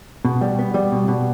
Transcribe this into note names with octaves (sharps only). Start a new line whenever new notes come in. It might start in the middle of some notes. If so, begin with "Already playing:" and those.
B2
G3
B3
G3
B2
B2